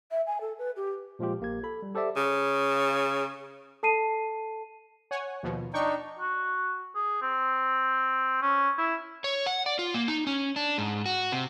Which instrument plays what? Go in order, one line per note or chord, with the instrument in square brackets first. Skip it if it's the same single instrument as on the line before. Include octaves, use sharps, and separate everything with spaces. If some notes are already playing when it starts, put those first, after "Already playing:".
[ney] E5
G#5
A4
B4
G4
[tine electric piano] A#2 F3 G#3 F4 G4
A#1 A#3 G4 G#6
A4 B5
G3
G4 A4 C5 D5 E5 D6
[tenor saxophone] C#3
[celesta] A4 A5 C7 D#7
[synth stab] C#5 F#5 G#5
D#2 B2 F3
[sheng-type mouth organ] D4 D#4 [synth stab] G5 C#6
[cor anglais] F#4
G#4
C4
C#4
E4
[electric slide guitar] C#5
F#5
D5
F4
A#3
D#4
C#4
D4
G#2
F#4
C3